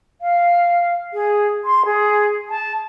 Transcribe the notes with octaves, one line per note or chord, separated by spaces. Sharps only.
F5
G#4
C6
G#4
A5